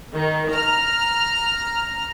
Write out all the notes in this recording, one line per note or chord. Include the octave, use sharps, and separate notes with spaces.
D#3
A#5 F6